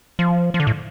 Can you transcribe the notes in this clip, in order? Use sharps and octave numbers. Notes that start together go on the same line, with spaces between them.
F3
F3
D3
A2